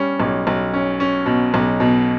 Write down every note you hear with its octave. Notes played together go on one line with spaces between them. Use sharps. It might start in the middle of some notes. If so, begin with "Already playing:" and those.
Already playing: G3 C#4
B1
B1
C#4
C#4
B2
B1
B2